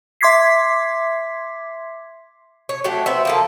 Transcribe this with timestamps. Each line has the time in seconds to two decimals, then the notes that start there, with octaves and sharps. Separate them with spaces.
0.21 E5 C6 D6 G#6 B6 C7
2.69 C#5
2.84 F#3 A3 F#4 G4
3.06 B3 C4 E5
3.25 F3 A#3 A4